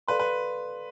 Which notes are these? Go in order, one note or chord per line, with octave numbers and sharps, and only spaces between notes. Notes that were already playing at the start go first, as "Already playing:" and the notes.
A4 B4 D5 F5 C6
B4